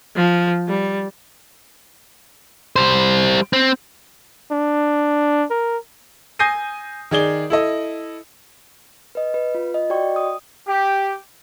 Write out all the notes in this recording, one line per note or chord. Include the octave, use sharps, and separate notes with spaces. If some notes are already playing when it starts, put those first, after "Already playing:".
F3
G3
G3 C5
C4
D4
A#4
G#5 D#6 G6 A#6 C7 D#7
D#3 G#4 D5 G7
E4 A4 D#5
B4 D#5
B4
F4
D#5
F#4 D5 D#5 G5 C#6
D#6
G4